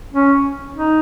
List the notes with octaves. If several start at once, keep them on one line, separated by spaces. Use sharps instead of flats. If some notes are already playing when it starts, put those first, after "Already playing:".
C#4
D#4